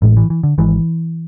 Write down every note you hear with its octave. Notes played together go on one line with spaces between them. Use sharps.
A1 A2 G#3
E3
E3
D3
G#1 G#2 E3